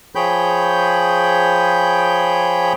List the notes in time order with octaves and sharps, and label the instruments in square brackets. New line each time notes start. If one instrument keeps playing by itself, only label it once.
[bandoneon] F3 G#4 C#5 G5 B5 G6